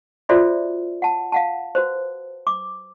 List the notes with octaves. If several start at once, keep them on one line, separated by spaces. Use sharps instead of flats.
F4 F#4 A4 C5 D5 E5
F#5 A5
F5 F#5 A5
F#4 B4 C5
D6